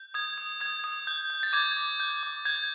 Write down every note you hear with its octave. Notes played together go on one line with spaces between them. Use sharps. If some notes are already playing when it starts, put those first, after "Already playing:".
Already playing: G6
D#6 G#6
D#6
D#6 G#6
D#6
G6
G6
A6
D6 G#6
D6
G6
D6
G6 G#6